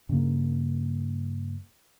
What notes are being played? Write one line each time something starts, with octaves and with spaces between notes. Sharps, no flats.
G2 C#3 A#3